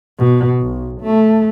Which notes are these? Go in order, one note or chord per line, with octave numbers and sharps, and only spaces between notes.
B2
B1
A3